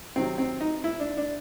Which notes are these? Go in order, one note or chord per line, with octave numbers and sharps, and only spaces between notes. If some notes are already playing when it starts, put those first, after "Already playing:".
C3 D#3 F#3 C4
C4
D#4
E4
D4
D4